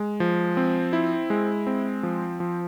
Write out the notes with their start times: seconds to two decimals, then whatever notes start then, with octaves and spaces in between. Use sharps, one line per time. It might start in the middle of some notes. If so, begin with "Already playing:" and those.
Already playing: G#3
0.20 F3
0.57 C4
0.93 E4
1.30 G#3
1.67 C4
2.03 F3
2.40 F3